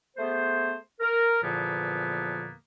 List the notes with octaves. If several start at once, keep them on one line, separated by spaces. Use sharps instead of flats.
A3 B3 G#4 C5
A#4
E2 A#2 D3 F3 A#3 B3